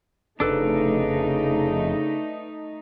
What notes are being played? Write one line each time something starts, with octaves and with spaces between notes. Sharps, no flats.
F1 C#3 A3 D4 D#4 A4 B4